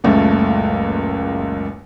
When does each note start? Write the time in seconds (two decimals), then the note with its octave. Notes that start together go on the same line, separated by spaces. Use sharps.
0.04 F#1 C#2 A#2 A3 A#3